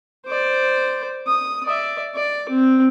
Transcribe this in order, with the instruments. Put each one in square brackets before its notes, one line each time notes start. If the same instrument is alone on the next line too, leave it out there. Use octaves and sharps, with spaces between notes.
[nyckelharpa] C5 D5
D#6
D5 E5
D5
C4